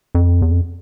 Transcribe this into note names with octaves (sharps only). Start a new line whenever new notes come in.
F2
E2
F2